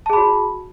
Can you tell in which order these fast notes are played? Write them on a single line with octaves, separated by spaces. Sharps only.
A5 G#4 B5 F#4